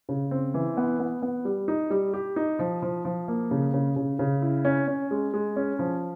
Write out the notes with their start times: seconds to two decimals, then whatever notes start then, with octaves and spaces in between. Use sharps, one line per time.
0.09 C#3
0.31 C4
0.54 E3
0.77 B3
1.00 B3
1.22 B3
1.45 G3
1.68 D#4
1.90 G3
2.14 G4
2.36 D#4
2.59 F3
2.82 F3
3.05 F3
3.28 A#3
3.51 C#3
3.74 C#3
3.96 C#3
4.19 C#3
4.42 E4
4.65 C#4
4.88 C#4
5.11 G#3
5.34 G#3
5.56 C#4
5.79 F3